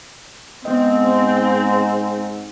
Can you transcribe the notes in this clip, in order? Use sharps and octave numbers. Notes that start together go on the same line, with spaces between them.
G#2 B3 C4 D#5